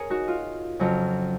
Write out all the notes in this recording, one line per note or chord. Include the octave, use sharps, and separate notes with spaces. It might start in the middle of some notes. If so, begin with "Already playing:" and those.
Already playing: G#4 A#4 C#5
D#4 F#4
F4
F2 C#3 F#3